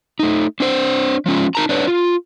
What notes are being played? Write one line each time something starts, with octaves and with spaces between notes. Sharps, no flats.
A3 D#4
C4 D4 C5
F3 G#3 C#4 F4
D#4 A#4 A5 A#5
D4 B4 C#5
F4